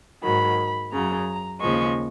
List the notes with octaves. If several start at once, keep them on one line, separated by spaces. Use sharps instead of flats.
G#2 D#3 F#3 B5
F#2 C#3 F#3 A#5
D#2 C#3 F3 G#3 C#6